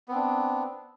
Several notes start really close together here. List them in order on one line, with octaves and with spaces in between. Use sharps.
B3 C4 D4